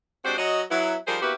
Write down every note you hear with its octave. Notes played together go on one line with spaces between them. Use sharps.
G#3 C4 D4 F#4 G4 C5
F#3 F#4 C#5 D#5
F#3 B3 E4
F3 G3 D#4 G#4 A#4 C5
A#3 B3 E4 F#4 G4 B4